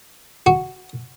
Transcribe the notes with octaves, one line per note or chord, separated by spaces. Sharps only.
F#4